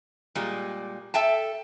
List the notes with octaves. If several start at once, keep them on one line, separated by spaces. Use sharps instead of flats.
A#2 G3 G#3
A4 E5 G5 A5